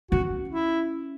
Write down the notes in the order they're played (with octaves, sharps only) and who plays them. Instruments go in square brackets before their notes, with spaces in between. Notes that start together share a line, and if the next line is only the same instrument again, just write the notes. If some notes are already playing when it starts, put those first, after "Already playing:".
[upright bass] C#4 [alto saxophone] F#4
[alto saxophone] E4